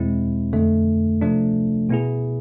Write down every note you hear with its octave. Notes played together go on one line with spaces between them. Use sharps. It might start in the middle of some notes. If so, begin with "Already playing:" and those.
Already playing: E2 B2 G#3 C4 E4
F2 D3 A3 D4
C3 F3 A3 D4
B2 B3 E4 G#4